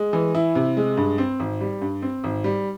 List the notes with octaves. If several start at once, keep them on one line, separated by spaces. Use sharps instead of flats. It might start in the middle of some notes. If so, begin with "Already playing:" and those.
Already playing: G#3
E3
E4
C3
G#3
G2
C4
G#1
G3
G2
C4
G#1
G3